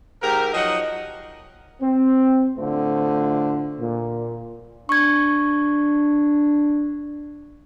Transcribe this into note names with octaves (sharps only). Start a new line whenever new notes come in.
G#2 G4 A#4
F3 F#3 D#4 D#5 F#5
C4
A2 D3 A3 F4 C5
A#2
D4 C#6 G#6